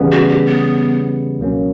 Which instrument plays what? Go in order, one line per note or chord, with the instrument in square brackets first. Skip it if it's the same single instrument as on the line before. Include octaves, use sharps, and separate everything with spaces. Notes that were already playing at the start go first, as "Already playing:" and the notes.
Already playing: [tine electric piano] E2 C#3 G3 B3
[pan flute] F#4
G4
B3
[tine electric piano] C#2 B2 F#3 A#3 C#4